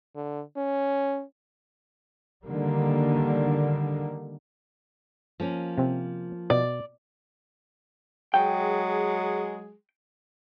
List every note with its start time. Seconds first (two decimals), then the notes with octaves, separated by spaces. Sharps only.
0.16 D3
0.57 C#4
2.46 D3 D#3 G3 A#3
5.40 F3 A#3 C#4
5.78 C3 C4
6.50 B2 D5 D#5
8.34 F#3 G#3 G#4 G5